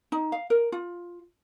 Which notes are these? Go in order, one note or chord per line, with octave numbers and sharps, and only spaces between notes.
D#4
F5
A#4
F4